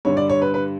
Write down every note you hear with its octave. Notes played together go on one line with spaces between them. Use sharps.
G2 D3 G3 C#5
D5
C#5
B4
B4